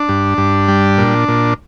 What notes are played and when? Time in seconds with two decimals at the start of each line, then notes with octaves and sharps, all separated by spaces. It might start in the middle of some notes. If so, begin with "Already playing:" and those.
Already playing: D4
0.09 G2
0.38 G2
0.68 G3
0.98 A#2
1.28 A#2